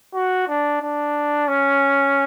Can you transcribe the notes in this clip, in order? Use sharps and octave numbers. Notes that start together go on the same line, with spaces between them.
F#4
D4
D4
C#4